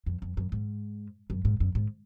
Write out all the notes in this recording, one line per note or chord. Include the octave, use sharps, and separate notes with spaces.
F2
F2
F#2
G#2
F#2
G#2
F#2
G#2